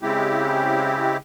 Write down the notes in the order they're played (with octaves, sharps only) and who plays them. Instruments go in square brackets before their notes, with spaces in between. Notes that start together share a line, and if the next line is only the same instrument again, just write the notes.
[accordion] C#3 G#3 C4 E4 G4